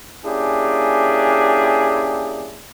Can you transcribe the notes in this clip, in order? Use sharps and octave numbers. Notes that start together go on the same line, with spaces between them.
A#3 C#4 D4 E4 G4 G#4